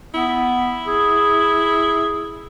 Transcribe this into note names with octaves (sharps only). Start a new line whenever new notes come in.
B3 E4
G#4